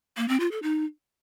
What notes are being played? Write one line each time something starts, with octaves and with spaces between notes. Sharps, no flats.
A#3
C4
F4
A4
D#4